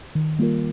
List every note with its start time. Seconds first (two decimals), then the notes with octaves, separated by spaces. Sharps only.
0.15 D#3
0.39 G3 A#3 F4 A#4